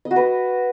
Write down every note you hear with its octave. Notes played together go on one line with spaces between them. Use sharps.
D#5
F#4
B4